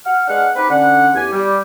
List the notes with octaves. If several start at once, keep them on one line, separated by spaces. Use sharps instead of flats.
F#5 F6
G#3 D4 G#4 B4 F5 F#5
C4 D#4 G4 B4
D3 C#4 F#5
E2 G4 G#5
G3